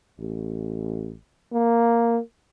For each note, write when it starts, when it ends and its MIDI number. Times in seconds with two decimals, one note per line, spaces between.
0.19 1.15 33
1.52 2.18 58